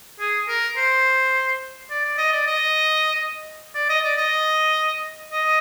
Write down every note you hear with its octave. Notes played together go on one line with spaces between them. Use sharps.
G#4
A#4
C5
D5
D5
D#5
D5
D#5
D5
D#5
D5
D#5
D#5